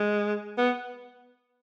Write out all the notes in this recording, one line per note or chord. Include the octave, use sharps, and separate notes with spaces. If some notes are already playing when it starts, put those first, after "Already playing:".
Already playing: G#3
B3